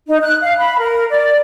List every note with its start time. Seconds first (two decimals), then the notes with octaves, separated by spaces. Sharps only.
0.07 D#4
0.22 F#6
0.43 F5
0.58 B5
0.79 A#4
1.10 D5